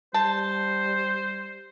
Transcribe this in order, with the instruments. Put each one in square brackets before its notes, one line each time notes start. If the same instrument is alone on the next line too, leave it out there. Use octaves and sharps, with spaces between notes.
[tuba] G3 [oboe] C5 [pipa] A5